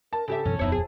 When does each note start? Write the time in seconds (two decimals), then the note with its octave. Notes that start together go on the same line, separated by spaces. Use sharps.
0.13 A#4 A5
0.28 C#3 G4 A4 E5
0.45 F#2 B2 E3 C#4
0.59 D#1 F2 B3 D#4 E4 C#5
0.72 G#4